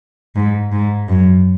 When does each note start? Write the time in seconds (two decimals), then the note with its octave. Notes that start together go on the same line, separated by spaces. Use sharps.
0.35 G#2
0.72 G#2
1.08 F#2